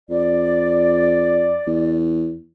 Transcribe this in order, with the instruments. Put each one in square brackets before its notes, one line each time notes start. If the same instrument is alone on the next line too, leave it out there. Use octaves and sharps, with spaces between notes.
[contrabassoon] F2 [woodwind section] D5
[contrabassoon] E2